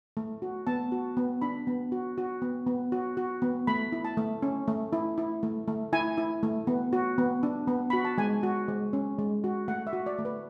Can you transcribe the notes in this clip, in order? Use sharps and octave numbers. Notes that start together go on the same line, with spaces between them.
A3
F#4
B3 A5
F#4
B3
D4 B5
B3
F#4
F#4
B3
B3
F#4
F#4
B3
A3 B5
E4
A5
A3
C#4
A3
E4
E4
A3
A3
E4 G#5
E4
A3
B3
F#4
B3
D4
B3
F#4 B5
A5
G#3 G#5
F#4
G#3
C#4
G#3
F#4
A3 F#5
E5
F#4
D5
A3
B4